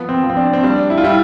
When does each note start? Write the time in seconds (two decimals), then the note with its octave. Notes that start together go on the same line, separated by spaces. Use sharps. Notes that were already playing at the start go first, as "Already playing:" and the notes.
Already playing: F3 B3
0.09 C4
0.23 F3
0.30 C4
0.37 D4
0.53 C4
0.63 G3 D4
0.90 E4
0.98 F4
1.04 G3 E4